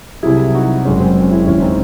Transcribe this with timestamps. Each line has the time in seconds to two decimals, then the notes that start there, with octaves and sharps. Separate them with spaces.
0.23 C2 C3 F#3 E4 G#4
0.54 D#4 F#4
0.85 F#1 F#2 C#3 G#3 C#4
1.00 C4
1.17 C#4
1.31 C#4 E4
1.47 E1 D#2 C#3 G#3 C#4 E4
1.58 C#4
1.62 C4 D#4